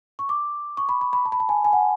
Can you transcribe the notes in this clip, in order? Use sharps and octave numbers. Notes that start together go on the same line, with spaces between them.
C#6
D6
C#6
B5
B5
B5
A5
B5
A5
G#5
G#5
F#5